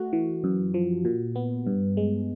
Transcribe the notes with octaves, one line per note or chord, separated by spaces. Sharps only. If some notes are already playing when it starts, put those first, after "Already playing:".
Already playing: A3 F#4
E3
F#2
F3
A#2
B3
G2
G#3